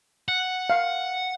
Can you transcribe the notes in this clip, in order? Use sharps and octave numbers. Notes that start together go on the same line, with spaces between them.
F#5
F5